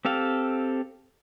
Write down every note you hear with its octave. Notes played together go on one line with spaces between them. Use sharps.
C4 G4 A4 F5